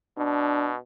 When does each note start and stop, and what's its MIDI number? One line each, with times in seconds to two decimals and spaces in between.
0.18 0.77 47
0.18 0.72 62